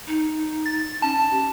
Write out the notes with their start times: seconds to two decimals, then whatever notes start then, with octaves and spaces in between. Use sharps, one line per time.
0.07 D#4
0.66 A6
1.02 C#4 A5
1.31 G4